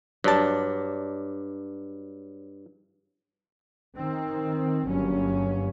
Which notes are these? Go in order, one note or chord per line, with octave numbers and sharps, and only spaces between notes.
G2 F#3 D4 F#4 A5
D#3 C4
G1 G2 F#3 A#3 C#4